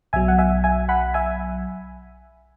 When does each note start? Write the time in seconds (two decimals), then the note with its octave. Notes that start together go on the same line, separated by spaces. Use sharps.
0.13 B1 B2 F#3 E5 G#5
0.28 F#5
0.39 E5 G#5
0.64 E5 G#5
0.89 F#5 B5
1.14 E5 G#5